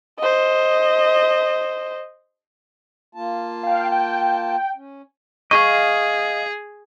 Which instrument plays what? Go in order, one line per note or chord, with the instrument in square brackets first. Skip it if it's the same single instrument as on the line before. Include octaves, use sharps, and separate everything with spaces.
[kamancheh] C5 D#5
[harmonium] A#3 F4 A5
[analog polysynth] F5 G5
G5
[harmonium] C#4
[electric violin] G#4 [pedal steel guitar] D#5 F5 [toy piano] C#6